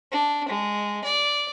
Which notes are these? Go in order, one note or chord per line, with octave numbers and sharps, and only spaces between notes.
D4
G#3
D5